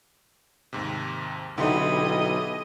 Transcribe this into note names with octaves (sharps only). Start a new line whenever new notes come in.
D#2 G#2 C3
B1 D3 D#4 E4 G4 D#5 C6